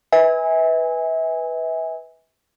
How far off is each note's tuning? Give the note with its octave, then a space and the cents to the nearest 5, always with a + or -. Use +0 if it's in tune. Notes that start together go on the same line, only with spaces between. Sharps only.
B4 +0 E5 -35 G#5 -15